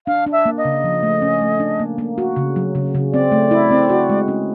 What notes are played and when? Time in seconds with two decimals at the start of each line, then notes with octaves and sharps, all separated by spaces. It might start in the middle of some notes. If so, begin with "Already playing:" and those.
0.07 D4 F5
0.26 D4
0.32 E5
0.45 A#3
0.58 D#5
0.65 C#3
0.84 F3
1.03 A3
1.22 C#4
1.41 A3
1.60 D4
1.79 A#3
1.98 A#3
2.18 F#4
2.36 C#3
2.56 F#3
2.75 C#3
2.95 C#3
3.13 C4 D5
3.32 A3
3.51 E4
3.71 C4
3.90 F#4
4.09 G#3
4.28 C#4